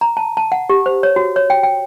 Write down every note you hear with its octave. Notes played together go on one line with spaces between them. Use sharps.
A#5
A5
A5
F#5
G4
C5
C#5
F#4
C#5
G5
G5